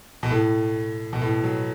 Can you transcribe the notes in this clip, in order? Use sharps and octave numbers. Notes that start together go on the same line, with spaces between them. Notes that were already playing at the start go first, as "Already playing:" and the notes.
B2
A2
B2
A2
F#3